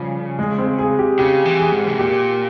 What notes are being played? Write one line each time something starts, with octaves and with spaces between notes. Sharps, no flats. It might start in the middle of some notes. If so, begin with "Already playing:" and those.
Already playing: C#3 F3 G3
G#3
C4
G#4
G4
C#3 G4
E3
G#4
G#2
C3
A#2 G4